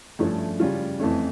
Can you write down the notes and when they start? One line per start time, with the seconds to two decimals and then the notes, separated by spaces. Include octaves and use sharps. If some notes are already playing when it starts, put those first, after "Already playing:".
0.19 G2 F3 A3 C#4 E4
0.60 C#3 G3 C#4 F4
0.99 F2 E3 A3 C#4